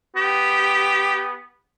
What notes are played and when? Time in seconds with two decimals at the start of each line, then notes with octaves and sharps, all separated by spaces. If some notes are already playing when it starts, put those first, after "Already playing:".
0.16 B3 G4